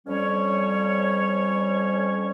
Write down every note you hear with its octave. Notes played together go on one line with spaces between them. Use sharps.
F2 G3 C#4 C#5